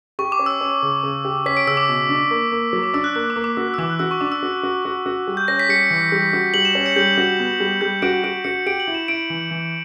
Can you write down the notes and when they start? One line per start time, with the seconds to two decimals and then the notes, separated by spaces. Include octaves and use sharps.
0.19 G4 C#6
0.32 D6
0.39 C#4
0.46 E6
0.61 C#4
0.82 C#3
1.03 C#3
1.25 G4
1.46 C#4 B6
1.57 D7
1.67 C#3 E6
1.77 D6
1.88 B2
2.09 D4
2.31 A#3
2.52 A#3
2.73 F#3
2.83 D6
2.94 D4 E6
3.04 F#6
3.15 A#3 F#6
3.30 D6
3.36 A#3
3.44 D6
3.57 F#4 E6
3.68 F#6
3.74 E6
3.78 E3 D6
3.90 F#6
3.99 F#4 E6
4.11 C#6
4.21 D4 D6
4.32 E6
4.43 F#4
4.63 F#4
4.85 F#4
5.06 F#4
5.27 G3
5.37 G6
5.48 C#4 A#6
5.59 B6
5.69 G3 C#7
5.90 E3
6.12 G3
6.33 F#4
6.54 G3 F#7
6.65 E7
6.75 C#4
6.86 C#7
6.96 G3 G6
7.18 F#4
7.39 B3
7.60 G3
7.81 G3 G6
8.02 F#4 D7
8.24 F#4 D7
8.44 F#4 C#7
8.66 G4 D7
8.80 F#7
8.87 E4
8.95 E7
9.08 E4 D7
9.30 E3
9.51 E3